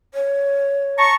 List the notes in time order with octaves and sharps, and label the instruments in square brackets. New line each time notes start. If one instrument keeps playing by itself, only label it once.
[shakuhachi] C#5
[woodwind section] A5 A#5 C#6